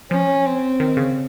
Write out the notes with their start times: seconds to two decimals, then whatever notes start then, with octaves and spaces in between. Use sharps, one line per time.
0.11 F3 C#4
0.46 C4
0.80 D#3
0.97 C#3